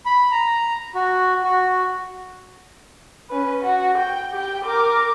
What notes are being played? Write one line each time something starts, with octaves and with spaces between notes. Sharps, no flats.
B5
A#5
F#4
F#4
C#4 B4
F#4
G5
G4 G5
A#4 D6